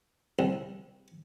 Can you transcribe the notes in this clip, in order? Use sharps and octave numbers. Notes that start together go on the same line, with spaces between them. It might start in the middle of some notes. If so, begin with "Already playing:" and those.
C2